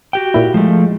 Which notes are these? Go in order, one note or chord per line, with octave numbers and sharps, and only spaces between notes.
F#4 G4 G5
A#2 E4
F3 G#3 A3